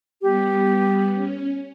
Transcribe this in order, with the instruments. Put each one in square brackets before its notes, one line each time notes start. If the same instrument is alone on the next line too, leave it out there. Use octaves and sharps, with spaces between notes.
[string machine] G3 B3 [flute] G4
[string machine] C#4